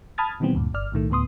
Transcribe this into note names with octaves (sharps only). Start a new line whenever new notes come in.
A5 B5 D#6 F6 G#6 A6
B2 D#3 E3 G3 B3 C4
D2 G2 A#2
G1 D5 F6
B1 A2 D#3 A3
D2 A2 B3 C6 D#6